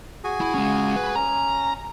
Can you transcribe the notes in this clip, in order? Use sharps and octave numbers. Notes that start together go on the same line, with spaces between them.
F#4 G#4 G#5
E4
G#3 C#4
B4
C#4 A#5